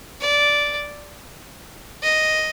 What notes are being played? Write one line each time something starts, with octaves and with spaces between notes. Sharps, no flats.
D5
D#5